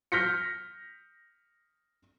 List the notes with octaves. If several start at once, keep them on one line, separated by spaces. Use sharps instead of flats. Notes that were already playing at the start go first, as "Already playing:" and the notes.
F6 G6 A#6 B6 C#7